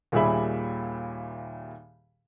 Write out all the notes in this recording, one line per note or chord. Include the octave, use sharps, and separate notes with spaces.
D#2 A#2 G3 G#4 E5 B5